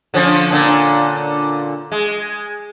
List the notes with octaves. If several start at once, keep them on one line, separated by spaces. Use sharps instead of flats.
D3 F3 C#4
A#2 D3
G#3